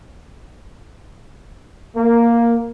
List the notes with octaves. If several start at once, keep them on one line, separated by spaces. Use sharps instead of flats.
A#3